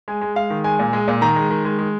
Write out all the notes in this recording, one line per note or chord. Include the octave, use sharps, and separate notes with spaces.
G#3 G#5
G#3
G#3 F5
D#3
G#3 G#5
A#2
G#3
A#2
D#3 A#5
G#3
D#3
G#3
G#3